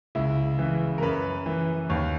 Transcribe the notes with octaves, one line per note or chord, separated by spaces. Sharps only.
C#2 E4
C#3 E3
A#4
F#2 B4
E3
D#2 C#5